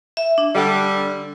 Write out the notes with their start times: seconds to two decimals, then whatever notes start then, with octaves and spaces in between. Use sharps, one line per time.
0.17 E5
0.38 D4
0.55 D3 G3